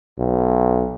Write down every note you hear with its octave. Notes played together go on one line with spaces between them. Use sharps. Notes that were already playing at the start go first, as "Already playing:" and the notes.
B1